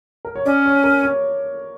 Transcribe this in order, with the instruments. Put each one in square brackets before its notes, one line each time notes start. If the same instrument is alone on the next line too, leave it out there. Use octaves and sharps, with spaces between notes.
[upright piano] A#4
C#5
[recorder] C#4 [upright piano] D5
[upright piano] C#5
A#4
C#5